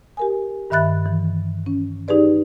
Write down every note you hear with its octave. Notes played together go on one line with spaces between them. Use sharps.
G4 A#4 G#5
G2 D#3 E5 B5 F#6 A6
E3
C#4
D#4 G4 G#4 B4 D5